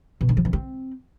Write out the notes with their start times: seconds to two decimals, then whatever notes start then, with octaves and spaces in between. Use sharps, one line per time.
0.21 B2
0.29 D3
0.37 F3
0.45 E3
0.53 C4